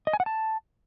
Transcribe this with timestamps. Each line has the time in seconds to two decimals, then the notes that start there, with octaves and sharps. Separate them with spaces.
0.07 D#5
0.13 G#5
0.20 F#5
0.26 A5